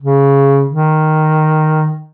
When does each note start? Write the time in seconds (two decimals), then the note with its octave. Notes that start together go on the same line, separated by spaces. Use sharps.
0.01 C#3
0.69 D#3